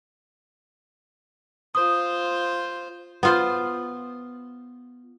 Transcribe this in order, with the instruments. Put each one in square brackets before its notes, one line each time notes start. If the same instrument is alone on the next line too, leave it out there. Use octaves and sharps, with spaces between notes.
[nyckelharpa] F4 C5 [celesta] D#6
[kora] B3 F4 C5